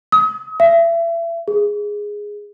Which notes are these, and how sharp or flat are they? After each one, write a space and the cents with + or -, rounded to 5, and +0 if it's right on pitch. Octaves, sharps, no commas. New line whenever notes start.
D#6 +35
E5 +30
G#4 -5